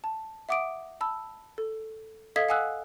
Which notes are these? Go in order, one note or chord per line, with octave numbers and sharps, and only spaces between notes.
A5
E5 F#5 D6 D#6 D7
A5 B5 E6
A4
A4 D#5 F5 D#6 G#6 B6
F5 F#5 G#5 D#6 E6 F#6